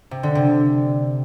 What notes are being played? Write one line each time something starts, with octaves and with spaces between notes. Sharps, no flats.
C3
D3
C3